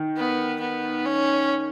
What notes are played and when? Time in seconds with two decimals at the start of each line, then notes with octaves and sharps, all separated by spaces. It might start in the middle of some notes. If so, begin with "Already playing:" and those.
Already playing: D#3
0.17 B3
0.60 B3
1.05 C#4